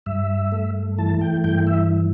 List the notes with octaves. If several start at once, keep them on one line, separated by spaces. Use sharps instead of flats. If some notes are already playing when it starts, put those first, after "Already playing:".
G2 E5
A3
E3 A5
G5
G2 G5
E5